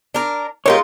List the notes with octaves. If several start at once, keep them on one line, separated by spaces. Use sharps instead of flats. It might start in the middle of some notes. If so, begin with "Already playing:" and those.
D4 A#4
G#3 D#4 F4 G4 A#4 C#5